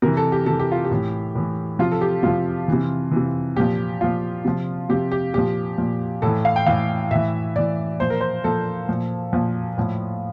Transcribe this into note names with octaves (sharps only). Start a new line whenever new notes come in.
C3 E3 A#4
A4
G4
C3 E3 A4
G4
F4
G4
A2 E3
A2 E3
C3 F3 F4
A4
G4
C3 F3 F4
C3 E3
C3 E3
A#2 F3 G4
A#2 F3 F4
C3 F3
C3 F3 G4
G4
A#2 F3 G4
A#2 F3
A2 E3 A4
F5
G5
A2 E3 F5
A2 E3 E5
A2 E3 D5
A#2 F3 C5
A#4
C5
A#2 F3 A4
A#2 F3
A#2 F3
A2 F3